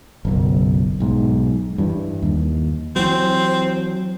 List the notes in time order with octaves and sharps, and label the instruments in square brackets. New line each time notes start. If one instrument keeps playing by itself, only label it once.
[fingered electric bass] F#1 B1
B1 G#2
G2 E3
D#2
[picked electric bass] E3 F#3 [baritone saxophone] C4